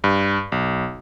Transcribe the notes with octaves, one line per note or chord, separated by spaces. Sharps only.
G2
B1